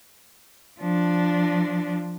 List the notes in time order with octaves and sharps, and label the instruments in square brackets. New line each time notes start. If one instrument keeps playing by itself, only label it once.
[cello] F3 D4